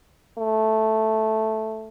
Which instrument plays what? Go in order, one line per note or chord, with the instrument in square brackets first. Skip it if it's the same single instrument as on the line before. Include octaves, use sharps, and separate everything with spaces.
[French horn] A3